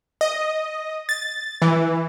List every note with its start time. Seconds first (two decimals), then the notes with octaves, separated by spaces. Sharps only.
0.21 D#5
1.09 A6
1.62 E3